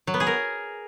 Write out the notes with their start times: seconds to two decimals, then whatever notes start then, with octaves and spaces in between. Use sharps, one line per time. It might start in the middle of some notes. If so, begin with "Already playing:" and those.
0.07 F#3
0.14 B3
0.20 G#4
0.27 A#4